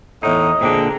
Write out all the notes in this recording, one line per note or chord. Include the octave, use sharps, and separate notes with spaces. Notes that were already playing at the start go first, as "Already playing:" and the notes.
E2 A2 D#4 D#5
A#2 D3 C4 D4 G#4 A#5